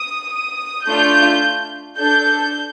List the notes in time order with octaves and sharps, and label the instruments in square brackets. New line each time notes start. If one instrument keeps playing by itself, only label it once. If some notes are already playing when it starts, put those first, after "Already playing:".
Already playing: [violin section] D#6
D#6
A3 D4 F4 G6
D4 A4 G6